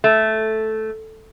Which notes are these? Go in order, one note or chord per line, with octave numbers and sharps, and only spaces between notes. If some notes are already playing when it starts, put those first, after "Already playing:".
A3